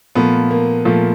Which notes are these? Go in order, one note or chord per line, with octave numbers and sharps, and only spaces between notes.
A#2 F3 A3 B3
A#3
A#2 F3 A3